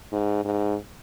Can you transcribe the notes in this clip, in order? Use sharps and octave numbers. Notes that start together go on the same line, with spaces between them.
G#2
G#2